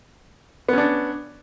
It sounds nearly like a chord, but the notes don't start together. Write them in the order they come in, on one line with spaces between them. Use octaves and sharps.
B3 C#4 D4